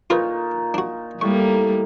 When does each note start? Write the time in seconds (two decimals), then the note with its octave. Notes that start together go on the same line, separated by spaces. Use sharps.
0.10 A#2 D#4 F4 A#4 B4 C#6
0.74 D4 F#4
1.21 A2 G3 A#3 C#6